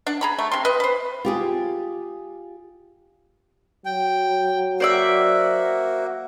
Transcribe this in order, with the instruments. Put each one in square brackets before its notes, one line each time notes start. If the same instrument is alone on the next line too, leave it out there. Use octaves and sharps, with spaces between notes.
[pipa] D4 F#5
G#4 A#5 B5
A3
C3 C6
B4 D#5
B4 C5
[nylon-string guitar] F4 G4 G#4
[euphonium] F#3 [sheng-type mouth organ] G5
[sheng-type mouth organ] A#3 F#4 [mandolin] C5 D5 E5